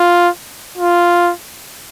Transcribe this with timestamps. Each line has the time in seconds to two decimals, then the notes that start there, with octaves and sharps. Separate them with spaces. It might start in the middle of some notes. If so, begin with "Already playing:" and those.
Already playing: F4
0.78 F4